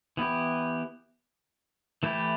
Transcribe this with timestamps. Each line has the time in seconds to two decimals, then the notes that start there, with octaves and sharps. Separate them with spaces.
0.17 E3 B3 E4 G4
2.03 E3 A3 E4 G4